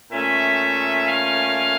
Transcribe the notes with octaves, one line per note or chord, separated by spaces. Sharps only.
A#2 A3 C#4 E5
F5